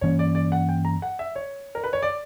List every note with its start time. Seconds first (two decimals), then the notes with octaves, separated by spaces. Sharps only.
0.01 G2 E3 A#3 C#4 C#5
0.19 D5
0.35 D5
0.52 F#5
0.69 G5
0.85 A#5
1.02 F#5
1.19 E5
1.36 C#5
1.75 A#4
1.84 B4
1.93 C#5
2.02 D5